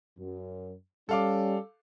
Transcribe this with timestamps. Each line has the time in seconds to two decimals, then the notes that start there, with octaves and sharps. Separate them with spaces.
0.18 F#2
1.09 G3 C#4 A4 F5 D6